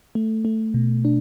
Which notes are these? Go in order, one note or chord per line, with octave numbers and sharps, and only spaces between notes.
A3
A3
B2
D4